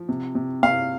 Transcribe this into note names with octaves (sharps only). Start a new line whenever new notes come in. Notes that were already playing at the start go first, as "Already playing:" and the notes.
Already playing: F3
C3
C3
C3 F5